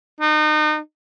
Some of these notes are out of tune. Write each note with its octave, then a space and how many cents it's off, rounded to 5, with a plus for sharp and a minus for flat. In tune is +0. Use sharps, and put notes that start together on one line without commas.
D#4 -35